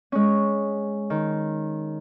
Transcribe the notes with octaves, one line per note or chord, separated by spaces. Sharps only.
G#3 C#4
D#3